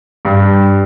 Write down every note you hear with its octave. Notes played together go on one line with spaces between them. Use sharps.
G2